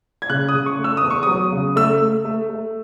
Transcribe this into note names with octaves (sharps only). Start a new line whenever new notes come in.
G#6
C#3 F#6
D#6
C#3
C#6
A3
E6
D#6
E2
C#6
F#3 D#6
C#3
A3 E6
A3
A3
A3